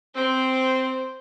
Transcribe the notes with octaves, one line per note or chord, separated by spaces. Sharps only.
C4 C5